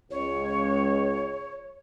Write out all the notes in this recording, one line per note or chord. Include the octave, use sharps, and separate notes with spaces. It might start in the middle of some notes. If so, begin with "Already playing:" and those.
C#2 C#5